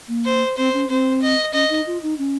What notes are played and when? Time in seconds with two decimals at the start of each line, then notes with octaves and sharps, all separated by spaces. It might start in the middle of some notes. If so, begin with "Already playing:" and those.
0.08 A#3
0.25 C5
0.57 C4 C5
0.73 C#4
0.89 C4 C5
1.22 D#5
1.53 C#4 D#5
1.70 D#4
1.87 F4
2.03 D#4
2.18 C#4